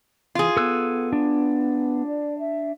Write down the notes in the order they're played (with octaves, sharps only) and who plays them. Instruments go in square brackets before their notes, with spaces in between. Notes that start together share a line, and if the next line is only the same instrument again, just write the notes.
[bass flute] E3 [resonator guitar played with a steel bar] F4 G#4
[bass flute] B3 [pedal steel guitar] A4 E6 F#6
[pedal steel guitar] D4
[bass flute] D5
E5